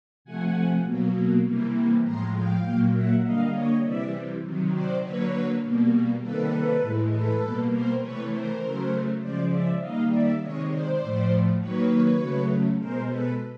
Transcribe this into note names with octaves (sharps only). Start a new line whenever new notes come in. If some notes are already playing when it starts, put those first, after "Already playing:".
C3 F3 A3 F#5 G#5
B2 F#3 A#3
C3 E3 G3 A#3
A2 F3 G#3 A#5 C6
F5 G5
A#2 F#3 A#3
E5 F#5
D3 G3 A#3 D#5 F5
C#5 D#5
C3 E3 G3 D5 E5
C3 D#3 F#3
C5 D5
D3 F#3 A#3 B4 C#5
B2 G3 A#3
C3 D#3 G3 A#3 A4 B4
A2 E3 G#3
A4 B4
B2 G3 A#3
A#4 C5
C3 E3 A3 B4 C#5
A#4 C5
C#3 F#3 A3
C#3 F3 G#3 C5 D5
D5 E5
D#3 G3 A#3 D#5 F5
D5 E5
C3 D#3 G#3 C#5 D#5
C5 D5
A2 F3 A3
D#3 F#3 A#3 B4 C#5
C#3 F#3 A3
B2 G#3 A#4 C5
A4 B4